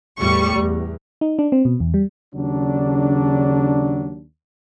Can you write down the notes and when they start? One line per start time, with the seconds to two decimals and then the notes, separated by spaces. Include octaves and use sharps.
0.20 E2 A2 G3 C#6
0.57 E2
1.21 D#4
1.39 D4
1.52 C4
1.65 B2
1.80 E2
1.94 G3
2.35 D#2 C#3 F#3 D4